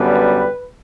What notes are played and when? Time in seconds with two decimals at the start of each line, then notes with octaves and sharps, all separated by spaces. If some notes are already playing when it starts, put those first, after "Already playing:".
Already playing: F#2 D3 G3 B3 B4